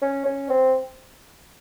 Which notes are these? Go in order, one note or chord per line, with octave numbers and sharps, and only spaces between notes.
C#4
C#4
C4